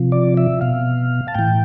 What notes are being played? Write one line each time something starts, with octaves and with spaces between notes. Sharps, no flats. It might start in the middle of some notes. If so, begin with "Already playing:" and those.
Already playing: C3 F3
D5
E5
B2 F5
A5
A2 E3 G5